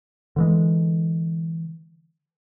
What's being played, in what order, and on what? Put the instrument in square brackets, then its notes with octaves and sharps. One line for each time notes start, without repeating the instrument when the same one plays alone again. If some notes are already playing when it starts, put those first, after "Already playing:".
[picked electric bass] D3 E3 G#3